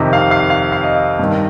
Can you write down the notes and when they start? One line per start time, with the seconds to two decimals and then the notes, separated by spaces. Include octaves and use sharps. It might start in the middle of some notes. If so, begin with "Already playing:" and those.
Already playing: F2 C3 D#3 D#5
0.13 F5
0.31 F5
0.50 F5
0.72 F5
0.84 D#5
1.19 G2 D#3